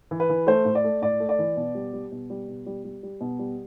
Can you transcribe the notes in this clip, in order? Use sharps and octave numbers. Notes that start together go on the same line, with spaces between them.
E3
B4
E3
A3 C5
A2
D5
A3
A2 D5
A3
D5
E3
B2
G3
G3
B2
G3
B2
G3
G3
G3
B2
G3